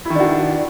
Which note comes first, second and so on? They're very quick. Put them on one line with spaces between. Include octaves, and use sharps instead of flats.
E4 D#3 D4 F#4